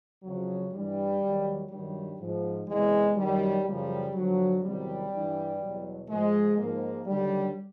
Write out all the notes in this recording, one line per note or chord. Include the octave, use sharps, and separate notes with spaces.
F2 C#3 F3 F#3
G2 E3 G3
D#2 D#3 F#3
G2 D#3 F#3 G3
G#2 F3
E2 C3 E3 G#3
F#2 D#3 F#3 G3
F#2 C#3 F3 G3
G2 D3 F3 F#3
E2 C3 D#3 F#3 G3
G2 E3
E2 B2 F#3
G#2 F3 G#3
G#2 F3 A#3
D#2 D3 F#3 G3